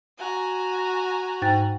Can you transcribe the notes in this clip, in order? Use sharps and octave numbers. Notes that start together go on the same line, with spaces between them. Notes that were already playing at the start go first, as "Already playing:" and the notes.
F#4 G#5 A#5
G#2 G5 F#6 A6